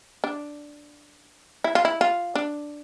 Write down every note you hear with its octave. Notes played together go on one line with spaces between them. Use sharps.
D4
E4
F4
E4
F4
D4